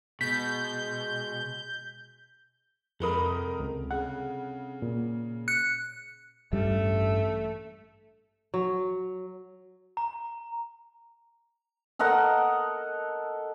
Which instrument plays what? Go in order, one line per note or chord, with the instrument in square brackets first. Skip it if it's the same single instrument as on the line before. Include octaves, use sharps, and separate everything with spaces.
[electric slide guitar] B2 [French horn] G#3 [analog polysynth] G6 [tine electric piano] B6
[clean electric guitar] C2 A4 B5 [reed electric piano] F2 [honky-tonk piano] G#3 A#4 D#6
[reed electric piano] C#2
[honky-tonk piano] C#3 [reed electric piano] F#5
[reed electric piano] A#2
[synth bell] F#6 C#7
[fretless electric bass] A1 G2 G3 [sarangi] A3
[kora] F#3
[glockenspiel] A#5
[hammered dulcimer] A4 A#4 D#5 F#5